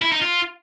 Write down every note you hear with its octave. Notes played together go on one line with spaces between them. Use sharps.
E4
D#4
F4